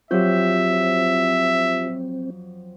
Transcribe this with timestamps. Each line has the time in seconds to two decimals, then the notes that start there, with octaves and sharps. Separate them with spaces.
0.11 F2 F#3 C4 F4 G4 E5 G6